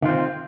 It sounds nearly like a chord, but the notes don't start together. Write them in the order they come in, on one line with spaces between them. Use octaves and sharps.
D#3 F4 C4